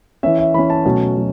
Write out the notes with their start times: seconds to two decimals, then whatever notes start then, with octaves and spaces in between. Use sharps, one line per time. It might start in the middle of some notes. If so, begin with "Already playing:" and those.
0.23 E3 C#4 E5
0.38 E5
0.54 E3 C#4 B5
0.70 A5
0.85 B2 F#3 A3 C#4
1.16 B2 F#3